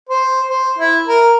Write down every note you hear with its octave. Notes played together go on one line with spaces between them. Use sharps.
C5
C5
E4
A#4